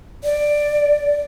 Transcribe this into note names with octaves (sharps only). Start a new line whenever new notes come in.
D5